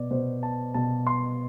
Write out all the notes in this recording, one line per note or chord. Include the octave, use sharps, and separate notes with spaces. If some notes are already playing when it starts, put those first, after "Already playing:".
Already playing: B2 D5
B2 C5
A5
B2 A5
C6